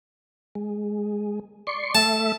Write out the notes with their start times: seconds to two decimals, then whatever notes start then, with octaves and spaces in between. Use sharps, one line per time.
0.55 G#3
1.67 D5 C6 C#6
1.95 A3 E5 A5